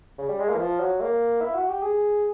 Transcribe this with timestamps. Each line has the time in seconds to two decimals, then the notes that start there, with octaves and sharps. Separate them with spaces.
0.18 C#3
0.29 G3
0.40 G#3
0.49 A#3
0.55 E3
0.59 F3
0.80 F#3
1.01 A#3
1.41 E4
1.55 F#4
1.69 G4
1.82 G#4